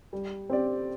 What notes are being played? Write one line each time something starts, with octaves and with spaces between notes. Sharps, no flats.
G3
C4 G4 D5